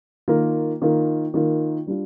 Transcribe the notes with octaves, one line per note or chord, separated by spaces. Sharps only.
D#3 A#3 F4 A#4
D#3 A#3 F4 A#4
D#3 A#3 F4 A#4
G3 D4 F4